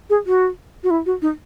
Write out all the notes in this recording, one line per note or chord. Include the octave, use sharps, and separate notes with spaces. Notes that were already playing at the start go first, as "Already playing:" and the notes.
G#4
F#4
F#4
E4
F#4
D#4